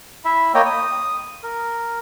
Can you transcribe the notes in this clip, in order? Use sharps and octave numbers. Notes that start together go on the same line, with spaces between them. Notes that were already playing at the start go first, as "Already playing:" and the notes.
E4 E5
A#3 C#5 D#5 G5
D#6
A#4